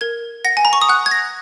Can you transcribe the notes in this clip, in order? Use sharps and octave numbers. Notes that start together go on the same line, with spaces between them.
A#4 G#6
F#5 A#6
G#5
A#5
C#6
D#6
F#5 F#6
G#6
A#6